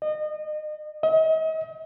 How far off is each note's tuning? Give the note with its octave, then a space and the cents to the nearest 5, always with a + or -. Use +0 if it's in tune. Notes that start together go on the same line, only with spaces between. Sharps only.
D#5 -30
D#5 +40